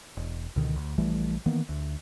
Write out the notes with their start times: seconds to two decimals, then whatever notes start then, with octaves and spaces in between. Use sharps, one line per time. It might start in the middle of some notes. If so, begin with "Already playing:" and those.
0.17 E1
0.56 C#2 B2 D3 D#3
0.76 D2
0.98 A#1 E3 G3 A3
1.46 D#3 E3 A#3 B3
1.69 D2